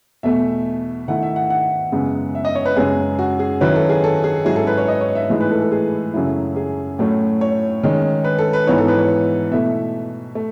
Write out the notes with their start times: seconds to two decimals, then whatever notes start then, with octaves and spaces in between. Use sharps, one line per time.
0.23 E2 B2 A3 E5
1.08 D#3 A3 E4 F#5
1.23 E5
1.36 F#5
1.50 F#5
1.92 F#2 C#3 G#3 B3
2.35 E5
2.45 D#5
2.55 C#5
2.65 B4
2.76 F#2 C#3 G#3 C#4 G#4
3.19 F#4
3.39 G#4
3.61 D#3 F#3 C#4 E4 B4
3.76 A4
3.89 G#4
4.04 A4
4.24 G#4
4.45 G#2 F#3 C#4 E4 G#4
4.56 A4
4.67 B4
4.78 C#5
4.88 D#5
5.01 C#5
5.15 E5
5.30 A2 E3 G#3 D#4
5.40 B4
5.51 A4
5.61 A4
5.72 G#4
6.14 F#2 C#3 F#3 A3 E4
6.56 G#4
6.99 A2 F#3 A3 C#4
7.41 C#5
7.83 D#3 G#3 C#4
8.24 B4
8.38 A4
8.53 B4
8.67 G#2 E3 B3 D#4 C#5
8.78 A4
8.88 B4
8.98 C#5
9.51 B2 A3 E4 E5
10.35 A3